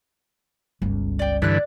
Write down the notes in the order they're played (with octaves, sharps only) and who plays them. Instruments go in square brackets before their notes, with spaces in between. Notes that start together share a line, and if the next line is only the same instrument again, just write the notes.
[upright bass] G1 C#2
[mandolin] D5 G5
[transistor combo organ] G2 D3 E3 [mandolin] D5 F#6